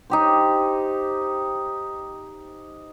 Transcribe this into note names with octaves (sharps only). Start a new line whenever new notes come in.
D#4 G4 C5